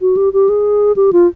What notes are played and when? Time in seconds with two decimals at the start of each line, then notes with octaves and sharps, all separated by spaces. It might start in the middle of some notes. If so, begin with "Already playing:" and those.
0.01 F#4
0.17 G4
0.33 G4
0.49 G#4
0.96 G4
1.13 F4